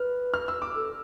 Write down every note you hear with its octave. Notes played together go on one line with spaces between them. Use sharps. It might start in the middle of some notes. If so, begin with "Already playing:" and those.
Already playing: B4 F6
F6
E6
D6
A4